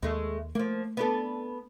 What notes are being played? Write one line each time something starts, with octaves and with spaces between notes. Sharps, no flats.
D#2 G#3 A3
F3 A3 A#3
B3 D4 A4